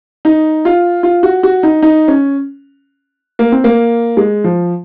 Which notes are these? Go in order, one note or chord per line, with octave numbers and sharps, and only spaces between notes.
D#4
F4
F4
F#4
F#4
D#4
D#4
C#4
A#3
C4
A#3
G#3
F3